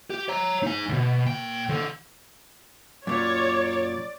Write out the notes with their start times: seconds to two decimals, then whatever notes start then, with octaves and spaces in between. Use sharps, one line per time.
0.10 G4
0.28 C#5 A#5
0.63 D#4 G#5
0.89 C#2 B2
1.27 A#2 G5
1.69 D#3 A4
3.07 F#2 A#2 C#5 D5